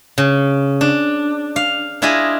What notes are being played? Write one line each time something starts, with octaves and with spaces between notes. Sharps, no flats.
C#3
D4
F5
D4 E4 F4 G#4 D#5